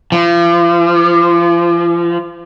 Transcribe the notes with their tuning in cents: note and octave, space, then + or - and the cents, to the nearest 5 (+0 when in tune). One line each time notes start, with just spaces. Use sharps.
F3 -35